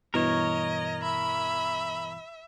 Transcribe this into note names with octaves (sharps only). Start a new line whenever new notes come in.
G2 B2 E3 A#4 C#5 D#5
E5 B5